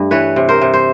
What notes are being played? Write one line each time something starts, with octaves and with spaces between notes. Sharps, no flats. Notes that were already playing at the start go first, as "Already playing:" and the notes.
Already playing: G2 A3
E3 B4 C#5
C3
A#4 C5
C3
C5